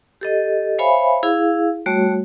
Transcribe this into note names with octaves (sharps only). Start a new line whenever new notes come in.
G4 A4 D#5
C5 C#5 E5 F5 G#5 B5
E4 G#4 F5
G3 A3 F#4 C#5